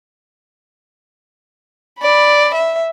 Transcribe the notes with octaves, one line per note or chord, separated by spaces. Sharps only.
D5 B5
E5